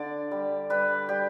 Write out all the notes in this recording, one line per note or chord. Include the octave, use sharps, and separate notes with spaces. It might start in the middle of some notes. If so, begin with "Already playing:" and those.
Already playing: D3 D5
G3
G3 B4
G3 G4